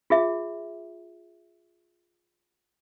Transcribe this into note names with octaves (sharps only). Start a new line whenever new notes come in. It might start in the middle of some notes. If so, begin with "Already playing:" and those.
F4 G#4 E5